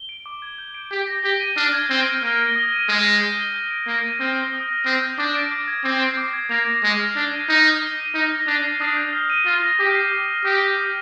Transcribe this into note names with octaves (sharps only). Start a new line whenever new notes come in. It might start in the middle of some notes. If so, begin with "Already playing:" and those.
Already playing: G7
D7
D6
G#6
G6
D7
G4 G6
A#6
G4 G7
D#7
D4 F6
G#6
C4 G7
D7
A#3 F6
A#6
D#6
D#7
G#3 D#6
A#6
G6
G7
G6
D7
A#3 G7
D#7
C4 F6
A#6
D#6
A#6
C4 D#6
G6
D4 D6
D7
D6
G#6
C4 D6
C7
D6
G#6
A#3 F7
A#6
G#3 D6
F6
D4 G7
D#7
D#4 G6
C7
G7
D#7
D#4 F6
A#6
D4 F7
C7
D4 D#6
G6
F6
D#7
F4 F6
A#6
G4 D6
C7
D6
F6
G4 D#6
D7
D#6